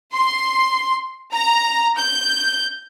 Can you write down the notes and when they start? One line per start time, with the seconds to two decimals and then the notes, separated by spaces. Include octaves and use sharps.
0.14 C6
1.33 A#5
1.99 G6